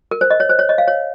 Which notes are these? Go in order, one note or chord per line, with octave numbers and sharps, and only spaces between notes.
A#4
C5
D#5
C#5
C5
C#5
D#5
F5
C#5